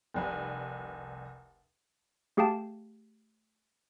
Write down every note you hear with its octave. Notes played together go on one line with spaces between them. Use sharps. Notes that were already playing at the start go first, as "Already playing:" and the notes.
F1 C2 B4
A3 G4 G#4 F5 G5 A5